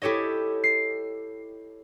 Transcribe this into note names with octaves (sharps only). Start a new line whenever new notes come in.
E4 G4 A4 C#5 D#5
C7